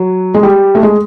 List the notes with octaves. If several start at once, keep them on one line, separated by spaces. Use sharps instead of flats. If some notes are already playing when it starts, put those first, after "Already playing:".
Already playing: F#3
G#3
G3
A3
G#3